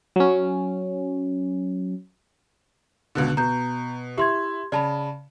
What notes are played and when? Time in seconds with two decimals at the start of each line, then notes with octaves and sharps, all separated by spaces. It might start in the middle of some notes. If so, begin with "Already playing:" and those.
0.16 F#3 C#4
3.15 C#2 B2 D3
3.37 B2 A#5 G6
4.18 E4 G4 C6 G#6
4.72 C#3 D5 A5 B5